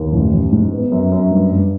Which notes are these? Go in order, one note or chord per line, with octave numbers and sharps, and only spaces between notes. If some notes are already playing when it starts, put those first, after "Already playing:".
Already playing: D#2
A1
A1
G#2
B3
F#2
F#2
G2
G2